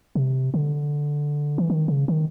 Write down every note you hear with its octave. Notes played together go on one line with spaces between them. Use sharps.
C3
D3
E3
D#3
C#3
D#3